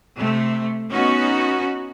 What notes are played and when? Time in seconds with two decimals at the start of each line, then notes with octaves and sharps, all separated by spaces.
0.18 C3 A3
0.90 B3 C#4 D#4 F#4